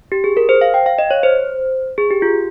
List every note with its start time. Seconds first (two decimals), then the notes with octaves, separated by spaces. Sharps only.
0.12 G4
0.24 G#4
0.37 A#4
0.49 C5
0.61 F5
0.74 G5
0.86 F5
0.99 D#5
1.11 C#5
1.23 C5
1.98 G#4
2.11 G4
2.22 F4